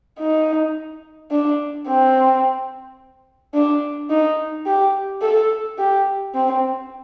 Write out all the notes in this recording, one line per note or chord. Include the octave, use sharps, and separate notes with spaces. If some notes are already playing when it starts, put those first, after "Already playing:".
D#4
D4
C4
D4
D#4
G4
A4
G4
C4